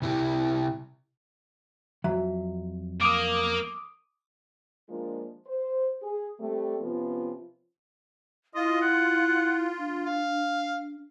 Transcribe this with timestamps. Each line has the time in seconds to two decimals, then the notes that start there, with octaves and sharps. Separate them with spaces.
0.02 C3 E4 G4
2.04 F2 F#3 E5
3.01 A#3 D6 D#6
4.89 F3 G#3 A#3 D4 F4
5.47 C5
6.02 G#4
6.39 G3 A3 C4
6.81 C3 F3 B3 C#4 F4
8.55 E4 F4 D#5
8.82 F#5
9.79 D4
10.06 F5